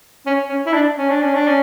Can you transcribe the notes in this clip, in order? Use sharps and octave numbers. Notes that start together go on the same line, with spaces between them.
C#4
C#4
E4
D4
C#4
D4
C#4
D4
C#4